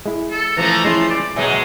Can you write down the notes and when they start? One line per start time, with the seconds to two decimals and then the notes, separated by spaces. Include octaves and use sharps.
0.06 G#3 E4
0.31 A4
0.57 E3 F3 A3 A#5
0.85 G#3 C#4 E4 C6
1.09 D5
1.36 B2 F#3 G#3 D#4 E5 G#5